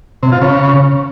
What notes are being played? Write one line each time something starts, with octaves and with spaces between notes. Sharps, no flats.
C3
F4
C#3